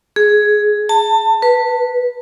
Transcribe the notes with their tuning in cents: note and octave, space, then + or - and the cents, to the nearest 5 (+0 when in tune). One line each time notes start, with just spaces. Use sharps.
G#4 +10
A5 +25
B4 -15